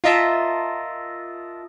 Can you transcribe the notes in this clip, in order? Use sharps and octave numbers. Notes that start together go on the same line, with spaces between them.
F4 A#4 D#5 E5 A5